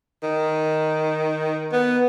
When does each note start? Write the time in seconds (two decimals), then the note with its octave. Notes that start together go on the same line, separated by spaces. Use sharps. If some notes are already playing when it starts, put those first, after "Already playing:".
0.23 D#3
1.72 B3